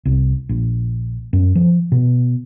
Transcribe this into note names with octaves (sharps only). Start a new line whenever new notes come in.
C2
A#1
F#2
F3
B2